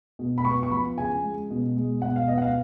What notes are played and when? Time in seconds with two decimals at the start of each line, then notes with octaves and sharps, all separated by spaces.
0.19 B2
0.38 B5
0.45 B3 C#6
0.63 C#6
0.71 F3 B5
0.98 C#3 G#5
1.23 G#3
1.51 B2
1.76 G#3
2.02 B2 F#5
2.16 F5
2.28 B3 D#5
2.38 F#5
2.42 F5